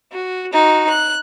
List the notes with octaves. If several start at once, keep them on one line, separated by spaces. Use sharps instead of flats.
F#4
D#4 F#4
F#6